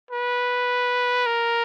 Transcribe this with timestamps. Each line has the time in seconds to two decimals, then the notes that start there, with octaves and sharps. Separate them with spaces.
0.11 B4
1.26 A#4